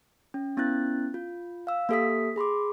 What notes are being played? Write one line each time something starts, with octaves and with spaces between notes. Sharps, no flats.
C#4
B3 C#4 E4 F#6 A6
F4
F5 E6
A#3 G4 A4 E5 D#6 B6
G#4 B5 C6 D6